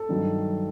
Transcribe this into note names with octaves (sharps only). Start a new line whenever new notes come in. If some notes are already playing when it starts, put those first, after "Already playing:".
Already playing: A4
G2 D#3 F#3